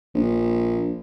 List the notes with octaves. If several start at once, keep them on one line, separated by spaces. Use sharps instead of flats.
A#1